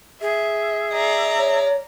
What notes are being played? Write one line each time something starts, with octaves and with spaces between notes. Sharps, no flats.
G#4 E5
D5 E5 A#5
C#5